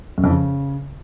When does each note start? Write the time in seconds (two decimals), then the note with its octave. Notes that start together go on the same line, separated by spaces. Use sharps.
0.18 F#2
0.24 F2
0.30 C#3